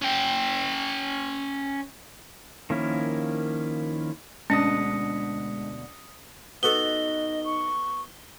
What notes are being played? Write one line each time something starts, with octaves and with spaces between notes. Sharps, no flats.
C#4 G5
D#3 F3 A#3 C#4 E4
D2 B2 G#3 C#4 D4 D#6 A#6 C#7
B3 D#4 F#4 A4 D#5 G7
C#6